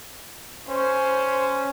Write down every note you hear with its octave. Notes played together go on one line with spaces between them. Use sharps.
C#4 C5